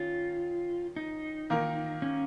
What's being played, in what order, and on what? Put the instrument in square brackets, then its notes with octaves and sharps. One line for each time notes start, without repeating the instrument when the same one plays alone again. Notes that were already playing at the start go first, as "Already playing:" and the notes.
Already playing: [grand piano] D#3 C#4 [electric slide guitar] F4
[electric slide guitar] D#4
[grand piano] D#3 A#3 F4 A#4
[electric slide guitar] C#4